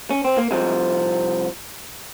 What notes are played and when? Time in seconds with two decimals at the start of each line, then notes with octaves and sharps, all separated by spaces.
0.11 C#4
0.24 C4
0.38 A#3
0.51 C2 C3 F3 G#3